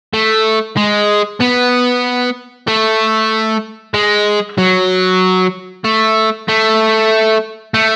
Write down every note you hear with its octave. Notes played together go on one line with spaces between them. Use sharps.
A3
G#3
B3
A3
G#3
F#3
A3
A3
A3